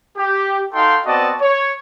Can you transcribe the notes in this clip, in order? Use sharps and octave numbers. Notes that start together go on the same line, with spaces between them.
G4
D#4 F#4 A4 F5 G5 C6
B3 C4 F#4 D5 D#5 A5
C#5